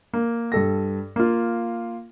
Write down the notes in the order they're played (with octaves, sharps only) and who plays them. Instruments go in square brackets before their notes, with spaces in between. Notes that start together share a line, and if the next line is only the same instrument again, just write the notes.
[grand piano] A#3
G2 A4 A#6
A#3 F4